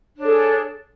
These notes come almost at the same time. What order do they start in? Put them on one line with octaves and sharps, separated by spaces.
D4 C#5 G#4 A4